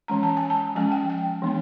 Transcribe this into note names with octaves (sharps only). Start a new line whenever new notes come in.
E3 G#3 C#4 A#5
A5
G#5
A5
F3 G#3 C#4 G#5
G5
G5
E3 G#3 B3 D4